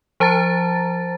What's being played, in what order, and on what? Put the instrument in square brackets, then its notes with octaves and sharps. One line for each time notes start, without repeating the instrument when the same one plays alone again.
[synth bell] F3 C5 A5 A#5 A6